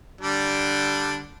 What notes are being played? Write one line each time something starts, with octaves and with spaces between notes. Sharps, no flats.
D3 G3 D4